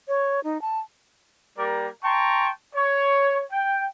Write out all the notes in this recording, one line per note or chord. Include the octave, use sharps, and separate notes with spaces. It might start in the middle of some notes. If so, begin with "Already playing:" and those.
C#5
D#4
A5
G3 A#3 G4 A#4 D5
G5 A5 A#5 C6 C#6
C#5
G5